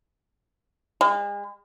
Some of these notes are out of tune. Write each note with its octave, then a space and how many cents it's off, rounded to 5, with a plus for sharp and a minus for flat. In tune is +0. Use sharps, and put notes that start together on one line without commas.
G#3 -40